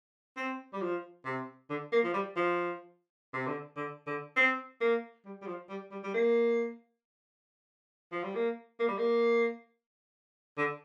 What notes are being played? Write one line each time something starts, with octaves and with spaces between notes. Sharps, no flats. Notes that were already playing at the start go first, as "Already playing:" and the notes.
C4
G3
F3
C3
D3
A#3
F3
G3
F3
C3
D3
D3
D3
C4
A#3
G3
G3
F3
G3
G3
G3
A#3
F3
G3
A#3
A#3
G3
A#3
D3